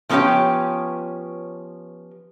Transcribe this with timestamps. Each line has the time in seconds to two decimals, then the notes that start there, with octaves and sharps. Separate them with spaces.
0.09 F3 B3 C#4 F4 G4 C#5